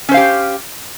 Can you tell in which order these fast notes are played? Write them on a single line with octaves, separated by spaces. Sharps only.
C#4 C5 F5 G4